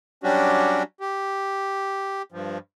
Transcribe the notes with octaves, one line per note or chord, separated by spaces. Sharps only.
F#3 G3 C#4 D4 F#4 G4
G4
G2 F3